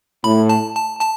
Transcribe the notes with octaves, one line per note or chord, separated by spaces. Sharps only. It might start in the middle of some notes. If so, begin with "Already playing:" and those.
A2 B5
A5
A5
A5